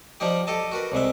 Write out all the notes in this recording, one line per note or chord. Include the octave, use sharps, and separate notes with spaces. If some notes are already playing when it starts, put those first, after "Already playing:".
F3 G3 D#4 G4
G4 A4 D#5 A5
F#4 A#4 B4
C2 C3 G#3 E5